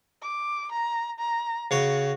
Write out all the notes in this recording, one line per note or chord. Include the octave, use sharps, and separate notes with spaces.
D6
A#5
A#5
C#3 F#4 C#5